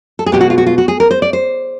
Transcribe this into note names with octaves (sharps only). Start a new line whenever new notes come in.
A4
G#4
B2 G#3 G4
F#4
F4
F#4
F4
F#4
G#4
A#4
C5
D5
C5